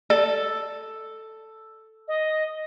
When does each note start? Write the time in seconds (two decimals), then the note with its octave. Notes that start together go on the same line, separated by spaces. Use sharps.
0.10 A4 D5
2.08 D#5